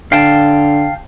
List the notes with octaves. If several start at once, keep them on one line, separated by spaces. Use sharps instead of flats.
D3 F5 G5 A5